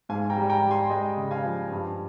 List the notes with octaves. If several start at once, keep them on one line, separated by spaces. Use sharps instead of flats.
G#2 F5 G#5
G5 A#5
G3
G5 A#5
G3
G#5 C6
G#3 D#5 G5
C#3
F5 G#5
F3
G2